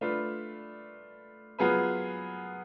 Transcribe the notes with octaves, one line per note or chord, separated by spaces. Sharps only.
A3 D4 F4 B4
F#3 B3 F4 G#4 B4